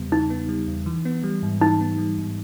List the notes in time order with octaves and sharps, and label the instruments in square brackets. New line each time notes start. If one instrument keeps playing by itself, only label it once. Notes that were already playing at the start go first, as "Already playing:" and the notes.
Already playing: [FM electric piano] E2 C#3 G3 B3
[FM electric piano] C#3 [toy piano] D#4
[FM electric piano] B3
G3
E2
E3
B3
G3
G#2
[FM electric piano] E3 [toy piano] D#4
[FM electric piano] B3
G3
G#2